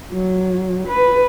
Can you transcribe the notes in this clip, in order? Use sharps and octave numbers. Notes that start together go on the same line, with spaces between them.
F#3
B4